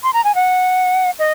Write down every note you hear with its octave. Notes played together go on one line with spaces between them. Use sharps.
C6
A#5
G#5
F#5
D#5